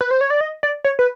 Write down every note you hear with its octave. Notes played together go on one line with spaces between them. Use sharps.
B4
C5
C#5
D5
D#5
D5
C#5
B4